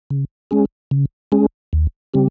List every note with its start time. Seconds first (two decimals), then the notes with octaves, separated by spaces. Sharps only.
0.10 C#3
0.51 G#3 C#4 G#4
0.91 C#3
1.32 G#3 C#4 G#4
1.73 D#2
2.14 C#3 G3 C4 G4